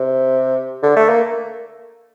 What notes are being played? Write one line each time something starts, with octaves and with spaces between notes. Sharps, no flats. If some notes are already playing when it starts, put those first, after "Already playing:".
Already playing: C3
D3
A3
A#3